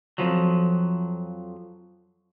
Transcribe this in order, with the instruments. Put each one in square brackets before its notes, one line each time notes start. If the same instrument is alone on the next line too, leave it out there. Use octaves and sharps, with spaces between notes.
[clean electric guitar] F2 B2 F3 F#3